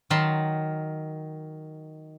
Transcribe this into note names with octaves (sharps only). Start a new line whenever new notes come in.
D#3 F#3 A5 B5 C6